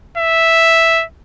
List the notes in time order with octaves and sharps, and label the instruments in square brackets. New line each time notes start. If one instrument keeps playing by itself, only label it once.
[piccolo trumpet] E5